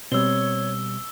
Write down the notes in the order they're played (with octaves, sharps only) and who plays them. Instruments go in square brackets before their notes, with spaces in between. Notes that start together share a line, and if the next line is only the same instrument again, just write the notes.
[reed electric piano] B2 G3 [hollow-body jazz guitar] C4 [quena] C#5 [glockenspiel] E6 G7